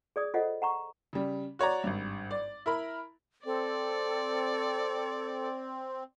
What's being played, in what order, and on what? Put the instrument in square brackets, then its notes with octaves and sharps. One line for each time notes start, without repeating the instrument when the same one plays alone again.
[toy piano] G#4 D5 D#6
F4 A4 C5 D#5 F#5
F#5 A#5 C#6
[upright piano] C#3 G3
F#4 C#5 D5 A#5
G#1 G2
D5
E4 A#4 B5
[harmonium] C4 [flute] A4 [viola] D5